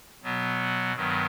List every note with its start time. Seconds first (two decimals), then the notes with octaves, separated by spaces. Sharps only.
0.23 B2 F#3 B3
0.95 G2 D#3 F#3 B3